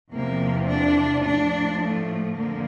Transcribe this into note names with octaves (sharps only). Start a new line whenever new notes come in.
E2 C3 F3 A#3
D4
A2 F3 D4
A3
F2 D3 F3 A#3